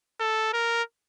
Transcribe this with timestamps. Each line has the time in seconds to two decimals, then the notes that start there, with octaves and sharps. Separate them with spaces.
0.20 A4
0.53 A#4